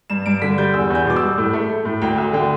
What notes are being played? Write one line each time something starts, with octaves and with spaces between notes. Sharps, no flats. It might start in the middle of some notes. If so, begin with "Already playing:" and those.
G2 E7
G2 D7
D3 B6
G3 G6
E2 E6
E2
G6
B2 D6
E6
G3
A2
A3
A3
A2
D2 G5
D2 E5
D3 G5